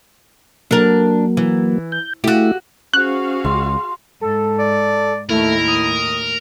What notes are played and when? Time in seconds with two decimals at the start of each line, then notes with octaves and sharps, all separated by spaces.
0.71 F#3 A#3 D4 A#4
1.37 E3
1.92 G6
2.24 A3 E4 F#4 G4
2.94 C#4 F#4 G#4 C5 F5 F#6
3.45 C#2 C6
4.21 G#2 A4
4.59 D5
5.30 D#2 A2 A3 E4 A#4
5.68 D#6